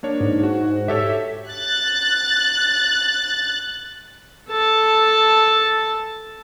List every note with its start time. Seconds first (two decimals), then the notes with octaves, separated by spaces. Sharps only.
0.03 A#3 D4 C#5
0.20 G#2
0.43 F#4
0.88 G4 A4 C#5 E5
1.50 F#6 A6
4.49 A4 A5